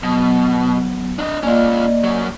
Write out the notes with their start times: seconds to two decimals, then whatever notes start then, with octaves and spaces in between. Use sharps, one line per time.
0.03 B2 F#3 B3
1.19 D4 D#5
1.43 A#3 C#4 F4 D5 D#5
2.04 F#2 F#3